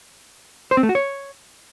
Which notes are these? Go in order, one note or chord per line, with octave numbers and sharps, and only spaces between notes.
C5
C4
A3
F#4
C#5